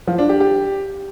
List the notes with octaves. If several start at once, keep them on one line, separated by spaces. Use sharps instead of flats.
F3
D4
G4
G4